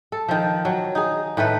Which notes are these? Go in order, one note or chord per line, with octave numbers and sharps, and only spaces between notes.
A4
D#3 F3
F#3
D#4 G#4
A2 D#3 A3 B4